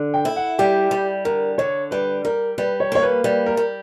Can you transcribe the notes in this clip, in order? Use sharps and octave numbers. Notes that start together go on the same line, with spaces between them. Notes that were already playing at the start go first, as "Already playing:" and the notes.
Already playing: D3
G5
E4
F#5
G3 G4
G3
D3 A#4
D3 C#5
G3 B4
G3 A#4
G3 B4
C#5
A#3 C#5
B4
G3 B4
A#4
G3